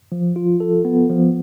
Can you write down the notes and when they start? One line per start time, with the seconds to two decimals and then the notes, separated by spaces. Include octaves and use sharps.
0.12 F3
0.36 F4
0.60 A4
0.85 B3
1.10 F3